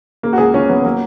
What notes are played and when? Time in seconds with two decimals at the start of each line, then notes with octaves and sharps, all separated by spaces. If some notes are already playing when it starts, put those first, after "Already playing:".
0.23 C#3 A#3
0.33 F#4
0.38 C#2 G#4
0.53 C#2 C#4
0.69 F#3 B3
0.85 F#3 A#3